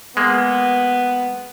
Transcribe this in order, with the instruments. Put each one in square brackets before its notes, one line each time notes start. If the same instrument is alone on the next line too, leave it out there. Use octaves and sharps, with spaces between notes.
[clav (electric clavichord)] G#3 A#3 [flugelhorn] B3